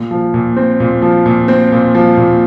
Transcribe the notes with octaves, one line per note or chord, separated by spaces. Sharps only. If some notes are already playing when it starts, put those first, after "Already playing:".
Already playing: A#2
F3
A#2
C4
A#2
F3
A#2
C4
A#2
F3
A#2